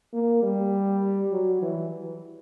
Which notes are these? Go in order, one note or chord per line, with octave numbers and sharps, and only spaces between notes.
A#3
G3
F#3
E3